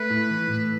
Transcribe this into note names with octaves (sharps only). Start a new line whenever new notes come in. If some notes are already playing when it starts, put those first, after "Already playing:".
Already playing: A3 B4
A2
E3
A2